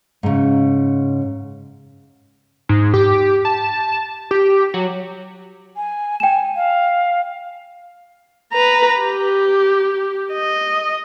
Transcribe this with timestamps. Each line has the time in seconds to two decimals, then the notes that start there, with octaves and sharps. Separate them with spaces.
0.23 G#2 C#3
2.69 G#2
2.94 G4
3.45 A5
4.31 G4
4.74 F#3
5.76 G#5
6.20 G5 G#5 E7
6.56 F5
8.53 B4 A#5
9.00 G4
10.32 D#5